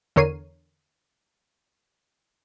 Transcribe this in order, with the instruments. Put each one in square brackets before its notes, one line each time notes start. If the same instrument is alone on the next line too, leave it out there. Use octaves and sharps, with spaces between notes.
[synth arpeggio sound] E2 D3 A#4 C#5 C7 D#7